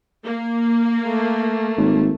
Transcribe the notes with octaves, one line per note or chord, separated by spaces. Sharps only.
A#3
A3
G#1